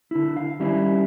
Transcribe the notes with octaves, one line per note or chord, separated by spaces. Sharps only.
D3 E4
F5
D#3 G3 C#4 E4